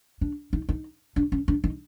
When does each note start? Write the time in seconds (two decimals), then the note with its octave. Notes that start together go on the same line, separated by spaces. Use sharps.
0.21 D4
0.53 D#4
0.69 D#4
1.16 D4
1.32 C#4
1.48 D4
1.64 D#4